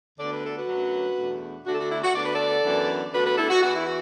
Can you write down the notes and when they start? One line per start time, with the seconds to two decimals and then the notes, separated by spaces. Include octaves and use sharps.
0.19 D2 D3 B3 D4 D5
0.31 B4
0.43 A4
0.56 F#4 B4
0.67 F#2 F#3 A3 D4
1.17 E2 B2 A3 D4
1.66 D2 D3 A3 D4 F#4
1.74 A4
1.78 F#4
1.90 E4
2.03 F#4
2.15 D2 D3 B3 D4 D5
2.25 B4
2.35 A4 D5
2.64 F#2 E3 B3 D4
3.13 D2 D3 B3 D4 F#4 B4
3.26 F#4 B4
3.38 E4 A4
3.50 F#4
3.62 E2 E3 B3 F#4
3.74 E4
3.86 F#4